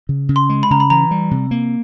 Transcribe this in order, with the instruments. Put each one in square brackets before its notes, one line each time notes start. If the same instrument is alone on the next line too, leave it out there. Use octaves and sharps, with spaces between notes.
[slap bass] C#3
C#3
[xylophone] C6
[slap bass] G#3
[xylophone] B5
[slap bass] C#3 [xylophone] A#5
[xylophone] B5
[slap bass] E3 [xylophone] A#5
[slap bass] G3
C3
A#3